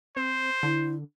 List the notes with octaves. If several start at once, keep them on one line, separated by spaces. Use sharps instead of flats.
C4 C5
D3 E4